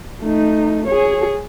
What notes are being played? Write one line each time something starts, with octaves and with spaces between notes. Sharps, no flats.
A3 D#4
G#4 C#5